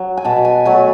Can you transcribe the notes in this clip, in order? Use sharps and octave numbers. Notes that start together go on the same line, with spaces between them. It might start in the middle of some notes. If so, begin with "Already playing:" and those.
Already playing: F#3
G#5
B2 A5
G#5
F#3 A3 G#5